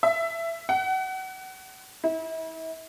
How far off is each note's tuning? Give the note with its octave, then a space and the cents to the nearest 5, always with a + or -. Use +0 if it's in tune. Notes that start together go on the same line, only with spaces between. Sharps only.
E5 +15
F#5 +30
E4 -40